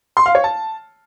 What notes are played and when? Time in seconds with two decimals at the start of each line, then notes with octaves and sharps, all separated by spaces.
0.17 C6
0.26 F5
0.35 C#5
0.44 A5